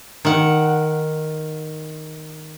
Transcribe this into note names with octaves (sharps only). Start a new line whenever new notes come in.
D#3 F#5